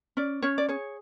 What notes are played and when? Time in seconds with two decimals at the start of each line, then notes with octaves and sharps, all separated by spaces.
0.17 C#4 D5
0.42 C#4 C#5
0.58 D5
0.69 G#4 C#5